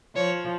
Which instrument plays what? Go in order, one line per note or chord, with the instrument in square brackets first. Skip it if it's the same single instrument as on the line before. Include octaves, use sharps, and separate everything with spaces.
[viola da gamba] F3 [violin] C#5